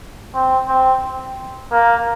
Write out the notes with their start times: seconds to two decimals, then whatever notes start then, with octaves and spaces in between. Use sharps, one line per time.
0.34 C4
0.68 C4
1.72 A#3